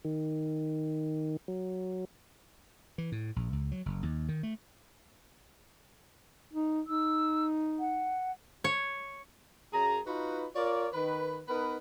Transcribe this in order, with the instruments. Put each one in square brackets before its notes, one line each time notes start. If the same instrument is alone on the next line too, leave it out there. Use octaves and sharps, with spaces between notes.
[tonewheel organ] D#3
F#3
[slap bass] E3
A2
A#1
C#2
F#3
F#1
D#2
D#3
A3
[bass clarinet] D#4
[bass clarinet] D#4 [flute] E6
[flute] F#5
[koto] C#5
[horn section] F#2 G#4 A#5
D#4 F4 F#4 B4
F4 A#4 C#5 D5
D#3 B4
B3 D#4 A#4 B4